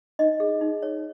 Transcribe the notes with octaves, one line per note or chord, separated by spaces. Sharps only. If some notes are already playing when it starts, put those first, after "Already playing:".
D#4 D#5
G#4
D#4
C#5